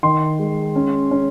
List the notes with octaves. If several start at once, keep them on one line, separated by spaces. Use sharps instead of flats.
D#3 C6
G#3
C#4
C#4